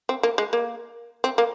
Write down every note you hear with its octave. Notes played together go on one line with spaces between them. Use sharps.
C4
A#3
G#3
A#3
C4
A#3